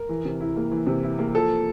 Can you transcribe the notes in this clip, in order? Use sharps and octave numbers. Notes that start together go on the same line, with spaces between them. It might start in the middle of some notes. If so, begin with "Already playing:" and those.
Already playing: A#4
E3
C3
E4
A#3
E3
C3
E4
A#3
F3 A4